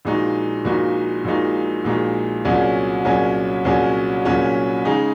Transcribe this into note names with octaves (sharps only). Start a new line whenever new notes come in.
A#1 A#2 G#3 D#4 F#4
A#1 A#2 G#3 D#4 F#4
A#1 A#2 G#3 D#4 F#4
A#1 A#2 G#3 D#4 F#4
C2 A#2 F#3 C#4 G#4
C2 A#2 F#3 C#4 G#4
C2 A#2 F#3 C#4 G#4
C2 A#2 F#3 C#4 G#4
C#3 G#3 D#4 G#4